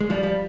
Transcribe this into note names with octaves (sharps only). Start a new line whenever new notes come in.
G#3
F3 G3
F3 G3